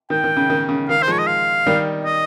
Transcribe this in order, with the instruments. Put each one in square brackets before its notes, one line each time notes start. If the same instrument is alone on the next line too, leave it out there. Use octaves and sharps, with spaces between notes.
[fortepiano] D#3 [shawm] G5
[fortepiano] D#3
C#3
D#3
C#3
[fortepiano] D#3 [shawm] F5
[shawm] C5
[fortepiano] F3 G#3 [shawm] C#5
[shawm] D#5
F5
[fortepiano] D#3 G3
[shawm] D#5